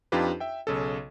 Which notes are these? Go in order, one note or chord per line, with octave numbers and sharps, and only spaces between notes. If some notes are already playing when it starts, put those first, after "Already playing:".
F2 D4 D#4 F4 G4 B4
E5 G5
B1 C#3 A4